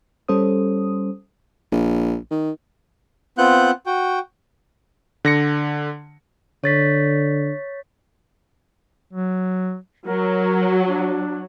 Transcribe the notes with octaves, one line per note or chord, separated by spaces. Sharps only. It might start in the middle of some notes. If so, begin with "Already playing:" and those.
G3 C#4 A4 C5 D#6
A#1
D#3
B3 C4 F4 F#5 F#6 G6
F#4 G5
D3 A#6 C#7
D3 C#5 A6 B6
F#3
F#3 A#4
D4